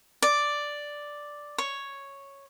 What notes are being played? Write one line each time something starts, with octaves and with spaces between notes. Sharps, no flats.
D5
C#5